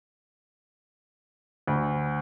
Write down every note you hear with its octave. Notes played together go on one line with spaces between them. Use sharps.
D2